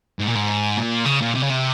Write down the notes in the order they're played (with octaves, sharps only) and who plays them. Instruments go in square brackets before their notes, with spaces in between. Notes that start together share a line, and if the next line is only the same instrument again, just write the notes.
[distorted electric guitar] G#2
A#2
G#2
A#2
C#3
A#2
C3
C#3
C3